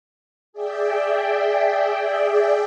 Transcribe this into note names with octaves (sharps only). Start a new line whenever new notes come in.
G#4 D5 E5 G5